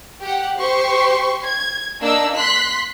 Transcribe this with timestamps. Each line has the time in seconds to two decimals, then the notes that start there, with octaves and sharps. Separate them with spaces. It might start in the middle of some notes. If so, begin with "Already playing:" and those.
0.22 G4 F#5
0.59 G4 C5 C6 C#6
1.44 G#6
2.02 A#3 D4 D#4 E6
2.37 C6 F#6 B6